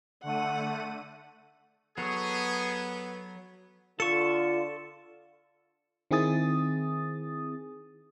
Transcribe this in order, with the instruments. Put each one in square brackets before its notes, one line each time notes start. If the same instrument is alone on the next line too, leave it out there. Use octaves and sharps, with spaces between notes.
[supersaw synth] D3 A3 D#7 [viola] F#5
[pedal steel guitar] F#3 A4 C#5 [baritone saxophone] B3 [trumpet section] G#4
[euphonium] D3 [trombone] F4 [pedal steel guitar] A4 C#6 [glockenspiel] A6 C#7 E7
[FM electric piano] D#3 C4 E4 G#4 D#6 A6